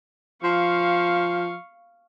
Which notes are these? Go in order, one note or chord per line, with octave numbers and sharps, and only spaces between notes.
F3 F5 C#6